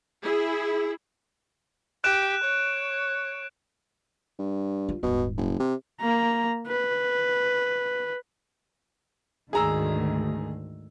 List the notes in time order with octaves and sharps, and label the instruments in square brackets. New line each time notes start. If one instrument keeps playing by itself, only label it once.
[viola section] E4 G#4
[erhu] G4 [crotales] F#6 D7 E7
[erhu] C#5
[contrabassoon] G2
[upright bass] F4
[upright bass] D#1 G#2 [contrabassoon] B2
[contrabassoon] F#1
C3
[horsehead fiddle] A#3 A#5
B4
[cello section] D2 [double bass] G#2 D#3 [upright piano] G#4 A#5 E6